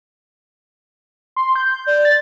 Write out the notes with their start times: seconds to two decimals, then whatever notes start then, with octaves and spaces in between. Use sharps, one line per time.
1.36 C6
1.56 G6
1.87 D5
2.05 A6